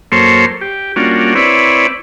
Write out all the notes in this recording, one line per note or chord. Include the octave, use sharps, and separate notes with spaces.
F#2 A#3 A4 C5 C#5 C6
G4
G3 A#3 C#4 D4 F4 F#4
C4 E4 B4 C#5 D5